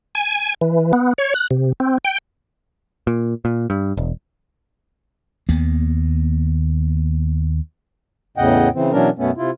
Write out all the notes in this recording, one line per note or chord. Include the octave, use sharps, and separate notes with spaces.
G#5
E3
B3
C#5
F#6
C3
C4
G5
A#2
A#2
G2
E1
D#2 A#3 B3
E2 A2 C#3 D#5 F#5 G5
C#3 E3 C4
B2 E3 F#3 C#4 D4 A#4
F#2 B2 A3 B3 C#4
C3 E4 F4